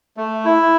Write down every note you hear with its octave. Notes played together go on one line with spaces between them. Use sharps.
A3
E4